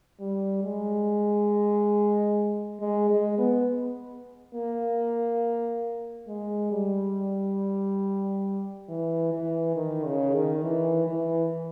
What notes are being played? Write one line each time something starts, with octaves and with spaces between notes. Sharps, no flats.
G3
G#3
G#3
G#3
B3
A#3
G#3
G3
E3
E3
D#3
C#3
D#3
E3
E3